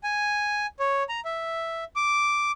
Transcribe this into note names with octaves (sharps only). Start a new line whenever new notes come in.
G#5
C#5
A#5
E5
D6